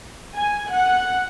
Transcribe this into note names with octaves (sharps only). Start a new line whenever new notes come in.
G#5
F#5